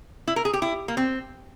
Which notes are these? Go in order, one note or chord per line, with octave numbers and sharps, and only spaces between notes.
E4
A#4
G#4
G4
E4
A#3
C4